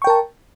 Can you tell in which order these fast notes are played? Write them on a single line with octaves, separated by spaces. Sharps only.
C#6 G5 A#4 A5